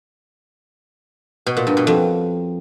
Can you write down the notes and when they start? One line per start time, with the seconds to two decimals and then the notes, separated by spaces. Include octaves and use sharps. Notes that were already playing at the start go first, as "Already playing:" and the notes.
1.46 B2
1.57 A#2
1.67 G2
1.77 B2
1.87 F2